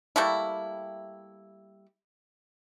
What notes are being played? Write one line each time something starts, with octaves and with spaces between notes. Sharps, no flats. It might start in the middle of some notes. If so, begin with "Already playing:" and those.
G3 A3 A#3 E4